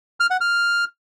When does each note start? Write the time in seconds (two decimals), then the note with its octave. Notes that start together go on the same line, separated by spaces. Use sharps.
0.20 F6
0.30 F#5
0.41 F6